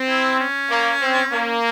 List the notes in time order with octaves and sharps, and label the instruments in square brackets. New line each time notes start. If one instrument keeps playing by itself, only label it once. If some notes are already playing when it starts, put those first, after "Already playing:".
Already playing: [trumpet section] C4
[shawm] E4
C#4
[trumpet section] A#3
C4
A#3